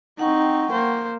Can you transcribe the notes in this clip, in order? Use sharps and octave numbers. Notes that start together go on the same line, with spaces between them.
C4 D#4 F#5 G5 C#6
A#3 C5